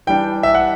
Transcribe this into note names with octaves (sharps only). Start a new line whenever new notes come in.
E3 G3 D4 G5
E5
F#5